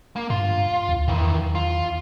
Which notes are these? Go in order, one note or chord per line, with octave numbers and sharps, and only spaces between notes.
A#3
G2 F4
D2
E2 D#3 E3
F4